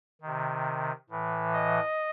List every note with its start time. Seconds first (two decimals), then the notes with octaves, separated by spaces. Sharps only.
0.22 C3 D#3
1.10 A2 E3
1.53 D#5